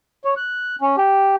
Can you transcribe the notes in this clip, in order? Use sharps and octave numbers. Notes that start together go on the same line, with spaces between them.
C#5
F#6
C#4
G4